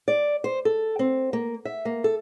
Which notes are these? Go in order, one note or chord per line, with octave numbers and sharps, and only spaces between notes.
D5
C5
A4
C4
A#3
E5
A#3
A4